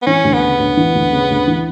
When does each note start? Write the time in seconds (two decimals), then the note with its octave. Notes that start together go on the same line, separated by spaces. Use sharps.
0.02 B3
0.07 E3 C#4
0.24 D2
0.33 B3
0.43 C#3
0.59 D2
0.77 E3
0.95 D2
1.12 C#3
1.30 D2
1.47 E3